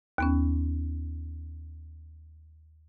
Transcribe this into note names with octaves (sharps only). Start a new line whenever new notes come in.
D#2 B3 C#4